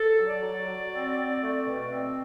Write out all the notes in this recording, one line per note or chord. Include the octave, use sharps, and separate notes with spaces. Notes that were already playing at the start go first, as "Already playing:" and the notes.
Already playing: A4
F#3
D5
F#3
F#3
C4
C4
A3
B2
C4